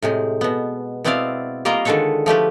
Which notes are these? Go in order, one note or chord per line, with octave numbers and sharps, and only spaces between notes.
A2 C3 G#3
B2 B3
B2 B3 C4 E4 D5 F5
G3 A#3 F4 A#4 D#5 A#5
D3 D#3 G#3 A4 B4 C#5
F3 A3 G4 B4